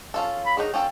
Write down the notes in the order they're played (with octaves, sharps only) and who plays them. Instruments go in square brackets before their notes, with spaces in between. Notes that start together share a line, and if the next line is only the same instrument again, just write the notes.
[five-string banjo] C#4 F4 A4
[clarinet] B5
[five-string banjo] D#3 F#3 D#4 [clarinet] G#4
[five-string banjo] C#4 F4 A4 [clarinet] G5